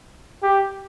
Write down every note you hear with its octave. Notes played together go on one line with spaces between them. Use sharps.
G4